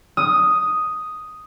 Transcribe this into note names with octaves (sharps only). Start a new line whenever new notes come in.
D#6